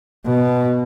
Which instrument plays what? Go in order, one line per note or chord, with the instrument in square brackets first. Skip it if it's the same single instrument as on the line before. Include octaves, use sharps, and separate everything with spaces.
[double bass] B2